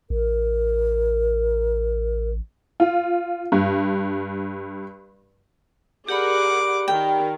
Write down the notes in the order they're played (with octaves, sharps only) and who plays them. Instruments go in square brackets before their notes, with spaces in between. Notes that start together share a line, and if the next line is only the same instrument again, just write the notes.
[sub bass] A1 [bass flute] A#4
[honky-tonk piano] F4
G2
[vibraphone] G4 D5 B5 [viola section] G#4 A#4 F#5 [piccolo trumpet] D6
[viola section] D#3 A#4 [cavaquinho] G5